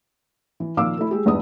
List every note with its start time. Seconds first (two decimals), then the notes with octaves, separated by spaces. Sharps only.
0.60 E3
0.77 A#2 D#3 F3 F5 D6 E6
0.97 A3 E4
1.11 G#3 G4 G#4
1.26 G#1 E2 G2 B3 B4 D#6